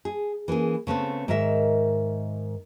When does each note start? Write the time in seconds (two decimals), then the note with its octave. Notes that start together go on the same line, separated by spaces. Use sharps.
0.05 G#4
0.48 E3 A#3 C#4 G#4
0.87 C#3 A3 B3 C4
1.28 G#2 D#3 A#4 E5